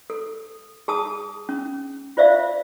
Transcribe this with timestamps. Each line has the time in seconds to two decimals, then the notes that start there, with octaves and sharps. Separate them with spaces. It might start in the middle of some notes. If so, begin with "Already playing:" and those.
0.10 A4
0.88 G#4 A5 D#6
1.49 C#4
2.17 F4 C5 D5 E5 F5